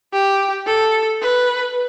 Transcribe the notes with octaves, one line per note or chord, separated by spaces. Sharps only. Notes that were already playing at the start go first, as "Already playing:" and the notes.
G4
A4
B4